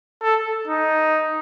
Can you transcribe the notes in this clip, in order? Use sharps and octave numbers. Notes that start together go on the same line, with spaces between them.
A4
D#4